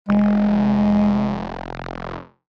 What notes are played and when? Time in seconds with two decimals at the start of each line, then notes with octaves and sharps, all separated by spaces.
0.09 F1 G#3